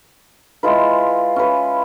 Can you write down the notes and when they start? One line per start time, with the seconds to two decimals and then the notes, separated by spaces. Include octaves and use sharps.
0.63 G#3 E4 F4 B4
1.36 C#4 B4